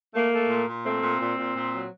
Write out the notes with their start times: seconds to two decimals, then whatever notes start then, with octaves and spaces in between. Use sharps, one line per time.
0.14 A3 A#3
0.32 A3
0.49 A#2
0.67 A#2
0.84 A3 C4
1.02 A#2
1.20 A#2
1.37 A#2
1.56 A#2
1.73 F#3